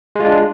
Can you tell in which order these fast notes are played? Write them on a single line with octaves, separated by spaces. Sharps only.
G#3 F4 D4